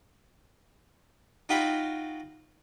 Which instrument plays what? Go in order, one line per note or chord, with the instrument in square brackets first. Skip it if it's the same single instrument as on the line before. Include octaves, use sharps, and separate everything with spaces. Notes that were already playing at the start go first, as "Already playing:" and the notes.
[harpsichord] D#4 F4 F#4 F5 G5 B5